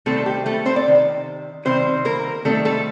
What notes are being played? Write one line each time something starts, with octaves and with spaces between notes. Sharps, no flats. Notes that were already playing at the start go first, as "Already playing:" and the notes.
C3 D#3 G3 A3 C4 A4
G4
A3 A4
C4 C5
D5
C3 D#3
C3 D#3 G3 C4 C5
A#3 A#4
C3 D#3 G3 A3 C4 A4
A3 A4